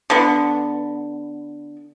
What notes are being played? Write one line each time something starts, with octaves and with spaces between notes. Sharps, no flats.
D3 B3